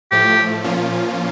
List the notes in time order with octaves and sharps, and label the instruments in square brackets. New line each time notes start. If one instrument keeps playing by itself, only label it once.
[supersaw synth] A2 F3 A3 [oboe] G4
[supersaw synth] A#2 F3 A#3 C#4 F4